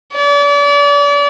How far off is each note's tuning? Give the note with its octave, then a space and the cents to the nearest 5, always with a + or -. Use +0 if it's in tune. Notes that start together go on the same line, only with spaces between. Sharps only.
D5 -40